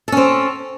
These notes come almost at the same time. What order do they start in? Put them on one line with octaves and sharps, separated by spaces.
A4 C#4 C4